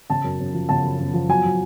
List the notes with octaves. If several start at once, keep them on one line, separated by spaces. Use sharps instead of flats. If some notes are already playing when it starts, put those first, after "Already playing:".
C#3 A5
F#2
F#2
F3
C#3 A5
F#2
F#2
F3
F#3 G#5
F#3